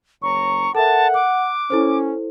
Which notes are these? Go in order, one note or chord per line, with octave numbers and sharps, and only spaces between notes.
F#1 C#5 A#5 C#6
A4 A#4 E5 F#5 A5
D6 F#6
C#4 E4 A4 C5